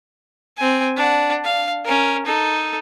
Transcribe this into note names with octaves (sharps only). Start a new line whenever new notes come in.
C4 G#5
D4 F#5
F5
C#4 A#4
D#4 A4